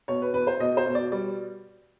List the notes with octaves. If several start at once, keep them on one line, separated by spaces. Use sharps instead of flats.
B2 C#5
B4
E2 B4
C5
B2 D#5
C5
B2
D5
G3 D5